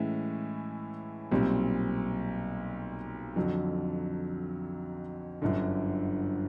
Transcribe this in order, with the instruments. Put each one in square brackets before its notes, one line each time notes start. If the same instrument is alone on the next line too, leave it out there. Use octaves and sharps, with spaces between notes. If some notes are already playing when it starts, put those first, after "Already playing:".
Already playing: [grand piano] A2 E3 G#3 C#4 E4
B1 A#2 G3 C4
F2 D3 F#3
G1 F#2 D3